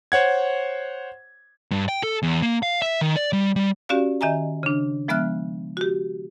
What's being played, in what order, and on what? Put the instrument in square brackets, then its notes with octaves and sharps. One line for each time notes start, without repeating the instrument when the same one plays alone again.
[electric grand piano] C5 C#5 F#5 G#6
[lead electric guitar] G2
G5
A4
E2
A#3
F5
E5
D#3
D5
G3
G3
[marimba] C#4 F#4 G4 D5 F5
D#3 D#5 E5 G#5 A#5
C#3 D4
F3 G#3 B3 E5 F6 F#6
F#4 G4